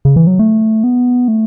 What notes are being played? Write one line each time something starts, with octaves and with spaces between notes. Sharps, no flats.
C#3
E3
F#3
A3
B3
A3